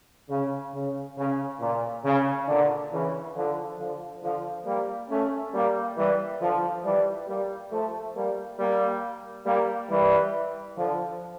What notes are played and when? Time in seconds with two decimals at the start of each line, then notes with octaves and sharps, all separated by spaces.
0.30 C#3
0.75 C#3
1.18 C#3
1.61 A#2
2.05 C#3
2.48 A#2 D3
2.92 C#3 E3
3.36 D3 F3
3.79 D3 F3
4.22 D3 F3
4.66 G3 A#3
5.10 A3 C#4
5.54 G3 A#3
5.98 E3 G3
6.40 D3 F3
6.84 E3 G3
7.28 G3 A#3
7.71 F3 A3
8.15 G3 A#3
8.59 G3 A#3
9.46 G3 A#3
9.90 E3 G3
10.77 D3 F3